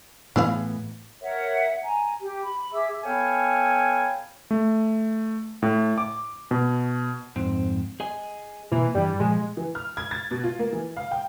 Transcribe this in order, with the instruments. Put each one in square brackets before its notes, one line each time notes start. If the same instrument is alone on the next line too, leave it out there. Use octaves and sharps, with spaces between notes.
[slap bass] A2 E3 B3 [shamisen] E4 G#4 F5
[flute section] A#4 C#5 E5 F#5
G#5 A#5
G4
B5
G#4 E5 D6 E6
[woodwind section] B3 A4 C#5 F5 G5 G#5
[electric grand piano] A3
A2
D6
B2
[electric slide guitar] F2 G#2 C4
G#4 D#5 G#5
[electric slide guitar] B2 A#3 [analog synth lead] E3
[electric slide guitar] G2 E3 [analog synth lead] G3
[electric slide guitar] A#2 F3 [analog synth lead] G#3
[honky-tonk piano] E3
F6
G#6
A6
B2
F4
A#3
E3
F5
G5